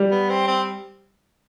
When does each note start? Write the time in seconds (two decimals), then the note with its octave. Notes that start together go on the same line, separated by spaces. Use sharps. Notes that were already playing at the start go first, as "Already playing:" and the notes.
Already playing: G3
0.11 B3
0.29 C4
0.47 C4